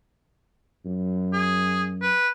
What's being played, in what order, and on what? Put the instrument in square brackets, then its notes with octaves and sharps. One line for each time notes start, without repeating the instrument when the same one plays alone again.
[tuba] F#2
[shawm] G#4
B4